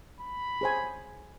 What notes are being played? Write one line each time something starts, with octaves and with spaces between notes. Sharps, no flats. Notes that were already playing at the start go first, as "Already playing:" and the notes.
B5
G#4 C5 G#5